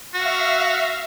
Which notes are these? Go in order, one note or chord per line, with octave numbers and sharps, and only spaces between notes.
F#4 E5 F5